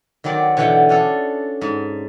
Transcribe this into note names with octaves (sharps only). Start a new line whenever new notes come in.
D#3 F#3 C4 D5
B2 D3 E3 F#5 G5
C#4 D4 A4
G#2